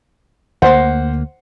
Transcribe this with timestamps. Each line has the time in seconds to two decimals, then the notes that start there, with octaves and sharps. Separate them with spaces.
0.62 D2 A#3 C5 F#5